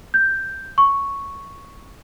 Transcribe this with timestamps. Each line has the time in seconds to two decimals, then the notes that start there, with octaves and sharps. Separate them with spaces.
0.14 G6
0.78 C#6